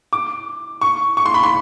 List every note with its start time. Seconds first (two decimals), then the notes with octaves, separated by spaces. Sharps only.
0.13 D6
0.81 C#6
1.17 C#6
1.26 C6
1.34 B5
1.43 C6